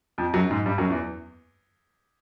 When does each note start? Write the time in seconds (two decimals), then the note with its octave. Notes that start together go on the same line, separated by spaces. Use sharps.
0.18 F2 F3
0.34 F#2 F#3
0.50 G#2 G#3
0.66 G2 G3
0.78 F#2 F#3
0.90 E2 E3